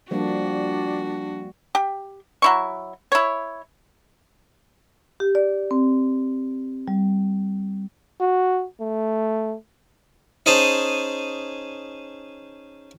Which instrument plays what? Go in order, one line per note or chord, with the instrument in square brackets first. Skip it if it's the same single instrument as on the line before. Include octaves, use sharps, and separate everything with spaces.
[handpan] F3 G3 A#3 [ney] D4 [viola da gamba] F#4
[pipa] G4
F#3 E4 C#6
E4 C#5
[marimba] G4
D5
C4
G3
[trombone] F#4
A3
[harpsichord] C#4 D#4 G#4 C5 A5